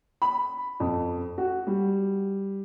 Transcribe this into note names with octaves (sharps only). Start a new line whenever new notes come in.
B5
F2
F#4
G3